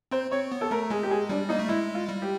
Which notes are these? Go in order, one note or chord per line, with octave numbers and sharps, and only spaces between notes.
C4 C5
C4 C#5
B3
A4
A3 A#4
G#3 G#4
G4
G#4
G3 D4
A#3 D#4
A3
G#3 E4
F4
G3
G4